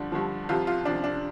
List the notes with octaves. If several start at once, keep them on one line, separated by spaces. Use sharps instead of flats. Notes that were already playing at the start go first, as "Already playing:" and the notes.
Already playing: G2 D3 F3 D4
G2 D3 F3
C2 C3 F3 F4
F4
C2 C3 F3 D4
D4